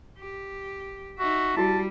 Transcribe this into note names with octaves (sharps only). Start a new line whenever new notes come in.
G4
D#4 F#4 E5
G3 E4 F#4 A5